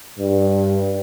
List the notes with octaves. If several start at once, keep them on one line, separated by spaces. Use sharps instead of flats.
G2